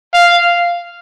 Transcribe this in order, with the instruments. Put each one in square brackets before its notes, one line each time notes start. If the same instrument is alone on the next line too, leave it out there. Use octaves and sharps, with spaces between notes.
[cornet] F5